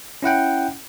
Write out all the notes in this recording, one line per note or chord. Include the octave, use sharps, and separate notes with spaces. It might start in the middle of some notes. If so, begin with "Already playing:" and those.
C#4 E4 F#5 G5